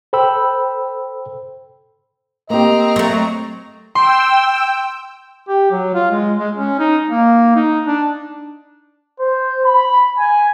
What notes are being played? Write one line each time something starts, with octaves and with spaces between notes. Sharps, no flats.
A4 C5 G5 B5 E6
A#3 C4 G4 D#5 A#5
F#3 A3
G5 C6 E6
G4
F#3
F4
G#3
G#3
C#4
D#4
A#3
D#4
D4
C5
B5
G#5